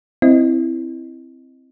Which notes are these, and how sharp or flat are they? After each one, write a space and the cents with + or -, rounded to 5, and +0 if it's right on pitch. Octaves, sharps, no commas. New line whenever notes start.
C4 +0 E4 +0 D#5 +0